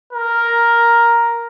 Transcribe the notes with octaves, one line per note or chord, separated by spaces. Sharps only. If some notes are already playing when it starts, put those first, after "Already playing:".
A#4